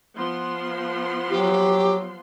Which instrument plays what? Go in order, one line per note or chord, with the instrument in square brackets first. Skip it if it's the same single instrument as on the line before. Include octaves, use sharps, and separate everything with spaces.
[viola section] F3 B3 C6
[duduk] F#3 [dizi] G4